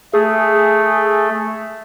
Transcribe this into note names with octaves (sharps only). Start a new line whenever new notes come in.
A3 G#4